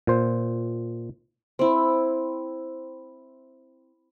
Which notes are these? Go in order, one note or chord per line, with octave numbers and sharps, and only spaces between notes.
A#2 C5
C4 E4